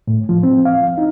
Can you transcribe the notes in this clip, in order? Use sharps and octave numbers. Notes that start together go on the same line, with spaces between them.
A2
F3
C4
F5
D#4